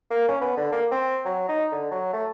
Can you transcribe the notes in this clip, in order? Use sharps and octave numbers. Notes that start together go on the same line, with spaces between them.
A#3
C#4
B3
D3
A#3
C4
F#3
D#4
D3
F#3
A3